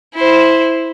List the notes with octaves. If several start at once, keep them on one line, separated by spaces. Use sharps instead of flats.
E4 C5